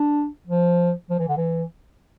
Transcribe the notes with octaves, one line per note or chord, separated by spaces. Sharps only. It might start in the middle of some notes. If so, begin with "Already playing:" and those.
Already playing: D4
F3
F3
E3
D3
E3